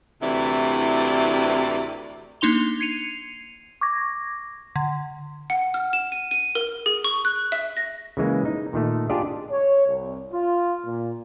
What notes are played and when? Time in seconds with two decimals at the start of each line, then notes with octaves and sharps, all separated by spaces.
0.22 D2 C3 E3 E4 D5
2.41 A#3 D4 D#4 C6 F7 G7
2.80 G#6 C7 C#7 D#7 F7
3.81 C#6 D6 G#6 A#6
4.76 D3
5.50 F#5
5.74 F6
5.93 E7
6.12 D#7
6.31 D#7
6.55 A#4
6.86 G#4
7.04 C#6
7.25 F#6
7.52 E5
7.77 A#6
8.17 C#3 E3 G#3 A#3
8.45 D#4
8.73 A#2 D#3 A3
9.09 D4 F4 G4 G#4 D5 D#5
9.50 C#5
9.85 C2
10.32 F4
10.84 A#2